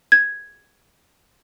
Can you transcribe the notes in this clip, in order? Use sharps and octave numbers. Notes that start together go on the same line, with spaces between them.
G#6